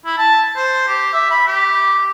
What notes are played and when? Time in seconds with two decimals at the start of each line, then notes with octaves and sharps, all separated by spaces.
0.05 E4
0.18 A5
0.56 C5
0.88 G4
1.13 E5
1.31 B5
1.47 G4